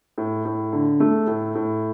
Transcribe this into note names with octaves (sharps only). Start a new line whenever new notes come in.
A2
A2
D3
A3
A2
A2